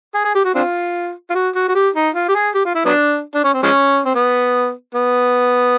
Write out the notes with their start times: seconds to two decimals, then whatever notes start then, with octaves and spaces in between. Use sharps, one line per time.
0.15 G#4
0.25 G#4
0.35 G4
0.45 F#4
0.55 C4 D4 F4
1.30 F4
1.35 F#4
1.55 F#4
1.69 F#4
1.75 G4
1.95 D#4
2.15 F4
2.29 G4
2.35 G#4
2.55 G4
2.65 F4
2.75 E4
2.85 F#3 B3 D4
3.35 D4
3.44 C#4
3.54 C4
3.63 F3 G#3 C#4
4.06 C4
4.15 B3
4.95 B3